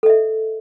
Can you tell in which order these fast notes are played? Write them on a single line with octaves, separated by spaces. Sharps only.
A4 D#5 E5